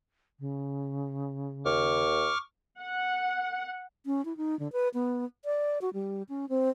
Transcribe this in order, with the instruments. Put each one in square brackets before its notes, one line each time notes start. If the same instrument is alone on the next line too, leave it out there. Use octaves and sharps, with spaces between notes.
[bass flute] C#3
[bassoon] D#2 [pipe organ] C#6 D6 F6
[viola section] F#5
[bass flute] C#4
E4
D#4
D3
B4
B3
D5
F#4
G3
C#4
C4